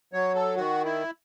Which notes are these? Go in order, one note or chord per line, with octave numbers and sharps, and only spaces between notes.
F#3 C#5
A4
D#3 F#4
E4